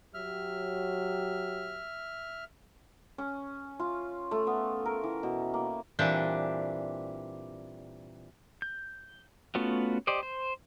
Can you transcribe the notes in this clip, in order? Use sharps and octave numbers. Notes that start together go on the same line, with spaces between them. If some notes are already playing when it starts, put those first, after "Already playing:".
F#3 G4 E5 F6
C#4
F4
A3
B3
A#4
E3
B2
A#3
A#2 E3 G3 C4 D4
G6
A3 B3 C#4 F4 F#4
G4 C5 D5 D#5
C5